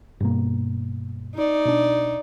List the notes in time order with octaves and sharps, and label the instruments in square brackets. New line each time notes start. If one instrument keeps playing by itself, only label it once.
[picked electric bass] G2 B2 A#3
[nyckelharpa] D#4 D5
[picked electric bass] B2 D4